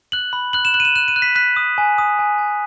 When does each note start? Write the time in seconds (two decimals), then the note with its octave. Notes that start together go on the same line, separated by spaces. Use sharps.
0.12 F#6 F#7
0.33 B5
0.53 F#6 F#7
0.65 E7
0.74 F#6 F#7
0.80 D#7
0.85 E7
0.96 F#6 E7
1.08 D#7
1.16 F#6
1.22 B6
1.36 F#6 B6
1.56 D#6
1.78 G#5
1.98 D#6
2.19 G#5
2.38 G#5